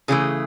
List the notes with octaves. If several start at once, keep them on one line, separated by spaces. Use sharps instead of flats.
C#3 E3 A3 G#4